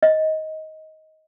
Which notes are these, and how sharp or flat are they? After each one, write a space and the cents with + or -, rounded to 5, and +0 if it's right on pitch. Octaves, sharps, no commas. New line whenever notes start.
D#5 +15